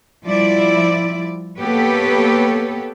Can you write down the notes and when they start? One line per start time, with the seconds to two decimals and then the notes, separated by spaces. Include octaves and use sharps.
0.26 F3 G3 E4 D5
1.58 A#3 B3 G4 A4 B4 C#5